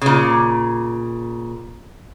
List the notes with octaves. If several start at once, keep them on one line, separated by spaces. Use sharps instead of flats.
A#2 C#3